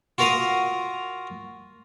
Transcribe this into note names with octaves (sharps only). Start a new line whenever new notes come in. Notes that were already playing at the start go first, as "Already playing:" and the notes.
F4 F#4 A#4 F5 A#5 D#6